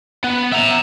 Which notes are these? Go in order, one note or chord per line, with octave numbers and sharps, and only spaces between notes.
B3
E5 A#5